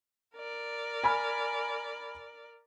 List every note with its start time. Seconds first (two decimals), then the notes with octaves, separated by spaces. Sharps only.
0.35 A#4 D5
1.04 G#5 B5 F6